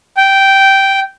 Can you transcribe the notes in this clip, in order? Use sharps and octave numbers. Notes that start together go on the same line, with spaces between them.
G5